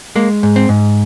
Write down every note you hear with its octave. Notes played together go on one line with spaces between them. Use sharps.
G#3 A#3
G#2
C4
G#2